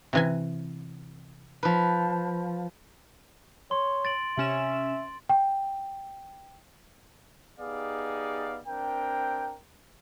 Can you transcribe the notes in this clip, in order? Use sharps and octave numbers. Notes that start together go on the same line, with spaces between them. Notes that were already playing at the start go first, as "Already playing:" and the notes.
C3 E3 G#5
F3 B4
C#5 C6
A6 D7 F#7
C3 C#4 E5 E7 F#7
G5
B3 D#4 G4 G#4 D5 F5
C4 D4 A#4 G5